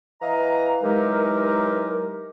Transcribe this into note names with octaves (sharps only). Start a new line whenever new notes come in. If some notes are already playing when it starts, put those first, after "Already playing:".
E3 D#5 F5 A#5
E3 F#3 G#3 D#4 G4 A#4